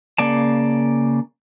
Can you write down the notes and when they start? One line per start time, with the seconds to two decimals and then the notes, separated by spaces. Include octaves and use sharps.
0.18 C#3 A#3 D5 A5